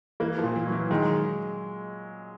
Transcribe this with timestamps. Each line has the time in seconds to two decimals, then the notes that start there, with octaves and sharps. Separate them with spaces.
0.20 E3 A#3
0.38 F3
0.44 A#2
0.56 E3
0.67 F#3
0.72 E3
0.90 D#3 G#3